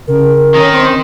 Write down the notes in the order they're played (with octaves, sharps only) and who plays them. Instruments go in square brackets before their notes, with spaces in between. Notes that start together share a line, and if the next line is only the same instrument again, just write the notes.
[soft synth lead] C#3 [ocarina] A#4
[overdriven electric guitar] D#3 [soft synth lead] C#4
[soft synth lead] C4 [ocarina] C6